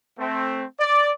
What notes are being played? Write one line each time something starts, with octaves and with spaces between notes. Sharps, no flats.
A3 C4
D5